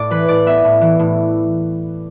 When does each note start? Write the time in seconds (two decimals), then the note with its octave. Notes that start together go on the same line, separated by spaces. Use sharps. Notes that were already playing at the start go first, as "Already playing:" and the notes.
Already playing: A2 D5
0.10 E3 B4
0.28 A2 D5
0.46 B3 E5
0.64 A2
0.81 E3
0.99 A2